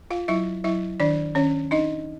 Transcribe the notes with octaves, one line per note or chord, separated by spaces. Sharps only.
F4 F5
F#3 E4 E5
F#3 E4 E5
D#3 D4 D5
D#3 C#4 C#5
D4 D#4 D#5